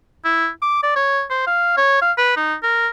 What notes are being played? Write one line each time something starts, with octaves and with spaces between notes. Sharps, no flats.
E4
D6
D5
C#5
C5
F5
C#5
F5
B4
D#4
A#4